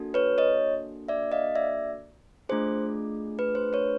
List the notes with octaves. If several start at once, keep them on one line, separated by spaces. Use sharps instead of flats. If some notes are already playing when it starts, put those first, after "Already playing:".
Already playing: A#3 D4 F#4 A4
B4 C#5
C#5 D#5
D5 E5
D#5 F5
D5 E5
A3 D4 F4 G#4 C5
B4
C5
B4 C#5